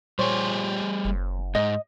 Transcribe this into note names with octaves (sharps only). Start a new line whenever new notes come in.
A#2 G3 G4 G#4 C5 C#5
F#1
G#2 D#5